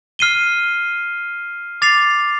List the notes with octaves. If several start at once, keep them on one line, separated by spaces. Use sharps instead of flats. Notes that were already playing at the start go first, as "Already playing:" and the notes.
F6 C7 D#7 G7
D6 A6 C7 F7